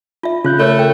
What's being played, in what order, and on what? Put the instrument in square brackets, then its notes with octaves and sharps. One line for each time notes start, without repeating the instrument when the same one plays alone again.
[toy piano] F4 E5
[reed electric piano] C#3 F#6 G6 [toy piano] F4
[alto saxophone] A3 [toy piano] A#4 C#5 B5
[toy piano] A#4 G5